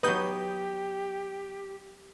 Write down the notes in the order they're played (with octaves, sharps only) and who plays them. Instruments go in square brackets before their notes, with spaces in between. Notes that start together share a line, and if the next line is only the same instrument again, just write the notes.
[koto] F#3 B3 D#4 [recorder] G4 [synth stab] B4 D#6 G6